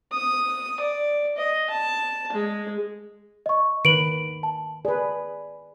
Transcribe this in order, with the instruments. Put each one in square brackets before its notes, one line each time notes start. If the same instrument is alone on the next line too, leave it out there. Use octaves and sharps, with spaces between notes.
[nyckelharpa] D#6
D5
D#5
A5
G#3
[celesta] D#5 C#6
[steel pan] D#3 B4 [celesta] D7 F#7
[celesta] A5
[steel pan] G#4 B4 [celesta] D5